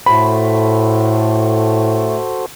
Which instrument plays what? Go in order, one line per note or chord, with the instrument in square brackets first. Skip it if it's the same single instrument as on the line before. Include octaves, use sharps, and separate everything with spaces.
[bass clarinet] A2 [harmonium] A3 [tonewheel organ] F#4 A4 C5 [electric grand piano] B5